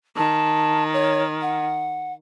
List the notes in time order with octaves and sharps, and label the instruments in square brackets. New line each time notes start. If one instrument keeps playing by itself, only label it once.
[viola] D#3 [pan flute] A5
[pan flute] C#5
F#5